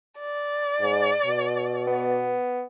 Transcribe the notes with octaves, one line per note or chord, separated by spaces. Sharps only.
D5
G#2
B2
B3